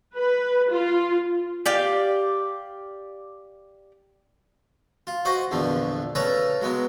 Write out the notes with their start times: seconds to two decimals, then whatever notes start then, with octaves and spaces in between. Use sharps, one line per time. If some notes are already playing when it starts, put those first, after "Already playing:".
0.15 B4
0.70 F4
1.66 G4 D5 F5
5.07 F4
5.25 F#4 C5 D#5 C#6
5.51 A#1 E2 D3 F3
6.15 C#3 C#4 A4 B4 A#5 C#6
6.61 F#3 G#3 B3